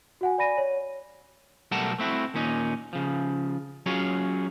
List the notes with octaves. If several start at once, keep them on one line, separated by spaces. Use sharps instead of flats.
F#4 F#5 G#5
D5 G#5 B5 A#6 D#7
C#5
B1 G3 A3 A#4 F#5 A5
A3 C4 E4 F#4
D#2 A#2 C#4 D#4
C#3 F3
F#3 C#4 F4 G#4 C#5